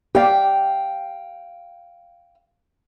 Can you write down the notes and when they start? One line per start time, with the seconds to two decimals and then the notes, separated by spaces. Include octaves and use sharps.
0.15 G4 D5 F5 G5